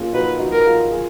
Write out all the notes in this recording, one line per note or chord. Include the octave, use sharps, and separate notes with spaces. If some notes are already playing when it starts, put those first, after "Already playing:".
Already playing: A#3 C#4 F4 G#4
D#4 F#4 B4
D#4 F#4
A#4
F4 G#4
F4 G#4